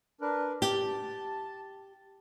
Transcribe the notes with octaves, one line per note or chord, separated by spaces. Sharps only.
D4 A#4 B4
G4 A5